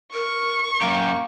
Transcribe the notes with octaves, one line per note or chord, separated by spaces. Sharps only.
A#4 C#6
F#2 F#3 A#3 G4